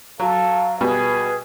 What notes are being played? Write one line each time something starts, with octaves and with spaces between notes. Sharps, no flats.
F#3 A4 F5
B2 G3 G#4 B4